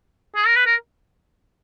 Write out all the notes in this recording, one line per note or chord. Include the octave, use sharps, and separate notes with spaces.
G#4
A#4
B4
A#4